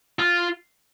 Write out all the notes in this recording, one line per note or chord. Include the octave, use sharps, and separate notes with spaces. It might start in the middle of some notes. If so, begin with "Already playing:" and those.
F4